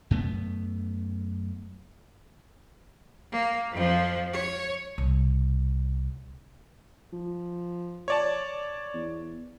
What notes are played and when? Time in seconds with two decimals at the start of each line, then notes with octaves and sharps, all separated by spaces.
0.11 F#2 A3 B3
3.31 A#3
3.71 F2 F3
4.32 C#5
4.98 C2 B2
7.13 F3
8.08 C#5 D5 A5
8.94 E2